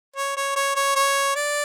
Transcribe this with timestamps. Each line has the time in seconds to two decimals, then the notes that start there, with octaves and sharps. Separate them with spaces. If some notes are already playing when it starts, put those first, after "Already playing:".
0.16 C#5
0.37 C#5
0.56 C#5
0.76 C#5
0.96 C#5
1.36 D5